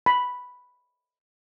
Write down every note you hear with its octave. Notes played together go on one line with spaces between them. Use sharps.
B5